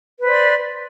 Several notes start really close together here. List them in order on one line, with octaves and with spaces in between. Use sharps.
B4 C5 D5 C6